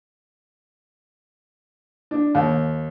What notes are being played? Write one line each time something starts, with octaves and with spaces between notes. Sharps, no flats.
D4
D#2